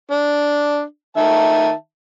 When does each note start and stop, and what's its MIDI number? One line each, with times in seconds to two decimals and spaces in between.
0.11 0.83 62
1.17 1.72 51
1.17 1.72 76
1.17 1.72 81